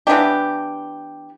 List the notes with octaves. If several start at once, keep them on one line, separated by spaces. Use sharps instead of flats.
E3 B3 D4 G4